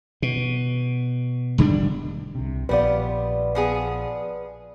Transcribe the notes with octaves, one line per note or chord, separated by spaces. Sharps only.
B2
E1 D3 G3 D4
C2 C3
A#1 G3 B3 F4 B4 D5
F3 B3 G#4